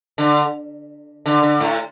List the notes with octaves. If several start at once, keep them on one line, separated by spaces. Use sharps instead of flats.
D3
D3
D3
A2